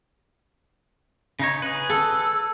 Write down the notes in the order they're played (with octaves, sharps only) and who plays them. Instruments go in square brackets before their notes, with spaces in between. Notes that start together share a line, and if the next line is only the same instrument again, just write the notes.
[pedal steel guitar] C#3 D#4 C#5
G#4 B4
[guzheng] A4